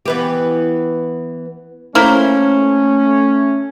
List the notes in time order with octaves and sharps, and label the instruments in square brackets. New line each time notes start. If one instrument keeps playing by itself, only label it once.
[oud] E3 B3 G4
[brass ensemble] A3 C#4 [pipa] A#3 E4 C5